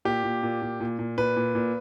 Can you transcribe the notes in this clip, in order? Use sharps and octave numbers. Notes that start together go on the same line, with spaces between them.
A#2 G4
A#2
A#2
A#2
A#2
A#2
A#2 B4
A#2
A#2